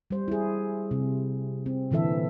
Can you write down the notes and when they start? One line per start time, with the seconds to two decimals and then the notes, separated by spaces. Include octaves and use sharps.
0.11 G3 C5
0.28 E4 G#4
0.91 C3
1.66 C4
1.91 A#2 D3 E3 A4 E5